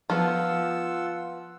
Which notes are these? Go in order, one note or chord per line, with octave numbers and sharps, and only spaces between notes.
F3 B3 F4 F#5 E6